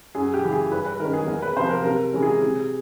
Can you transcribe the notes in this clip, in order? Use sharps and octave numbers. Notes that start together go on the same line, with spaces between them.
F#2 G#4
G4
C#3 E3
G#4
G2 B4
B4
D#3 G#3 C#4 A#4
G#4
E2 A#4
B4
C3 F3 C5
A#4
C3 A#4
E3 G#3 C#4
G#4
C3